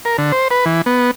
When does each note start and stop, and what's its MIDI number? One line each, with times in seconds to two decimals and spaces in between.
0.05 0.17 70
0.18 0.32 50
0.32 0.48 72
0.51 0.65 71
0.66 0.82 52
0.86 1.11 59